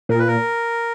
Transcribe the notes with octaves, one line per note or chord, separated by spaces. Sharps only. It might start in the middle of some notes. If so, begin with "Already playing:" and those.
A#2 A#4
B4
A#4